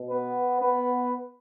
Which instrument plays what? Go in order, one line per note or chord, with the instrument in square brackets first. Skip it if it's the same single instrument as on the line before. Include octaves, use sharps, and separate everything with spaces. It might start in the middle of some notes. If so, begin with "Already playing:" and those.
Already playing: [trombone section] B2
B3 B4
B3 B4